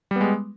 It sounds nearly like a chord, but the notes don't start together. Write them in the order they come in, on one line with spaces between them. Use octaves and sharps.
G3 B3 G#3